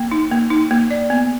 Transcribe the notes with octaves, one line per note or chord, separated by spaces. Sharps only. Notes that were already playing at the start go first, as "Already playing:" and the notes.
Already playing: A#3
D#4
A#3
D#4
A#3
D5
B3